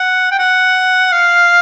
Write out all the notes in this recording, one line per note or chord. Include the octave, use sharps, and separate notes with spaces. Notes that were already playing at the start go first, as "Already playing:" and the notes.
Already playing: F#5
G5
F#5
F5